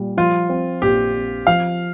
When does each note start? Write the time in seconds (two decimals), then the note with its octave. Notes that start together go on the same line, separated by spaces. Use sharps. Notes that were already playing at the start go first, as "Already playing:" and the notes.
Already playing: A#2 G3
0.17 F3 F4
0.49 C4
0.82 A#1 G4
1.15 C4
1.47 F3 F5